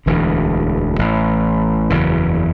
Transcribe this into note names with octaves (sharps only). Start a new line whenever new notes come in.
E1 D2 D3 E3
A1 A2
F#1 E2 C#3 E3